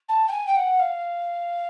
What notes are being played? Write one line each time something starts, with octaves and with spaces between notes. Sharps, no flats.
A5
G5
G#5
G5
F#5
F5